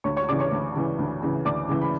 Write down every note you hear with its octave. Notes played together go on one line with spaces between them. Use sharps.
D2 C#5 C#6
C#5 C#6
C#3 E3 D5 D6
C#5 C#6
D2
C#3 E3
D2
C#3 E3
D2 D5 D6
C#3 E3
B5